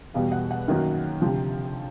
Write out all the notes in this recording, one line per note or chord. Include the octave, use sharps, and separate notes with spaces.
E2 B2 G3 F5
F#5
F#5
F#2 D#3 F#3 A#3
D2 C3 F3